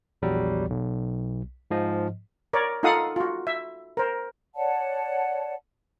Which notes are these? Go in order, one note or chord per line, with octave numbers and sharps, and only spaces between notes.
A#1 E2 F#3 G3
B1
G#2 F3 D#5
A#4 C#5 D5
D#4 F4 A4 F5 F#5 D#6
F4 F#4
E5
A#4 C5
C#5 D5 F#5 A5